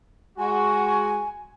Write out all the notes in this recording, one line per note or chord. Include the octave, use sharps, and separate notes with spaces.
G#3 F#4 G#5